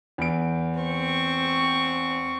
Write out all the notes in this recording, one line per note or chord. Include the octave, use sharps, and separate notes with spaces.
E2 D7
C4 C#6